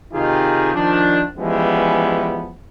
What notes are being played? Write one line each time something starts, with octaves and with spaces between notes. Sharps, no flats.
C3 D#3 D#4 F4 G4 G#4
D#3 F3 D4
E3 F3 G3 G#3 B3 C#4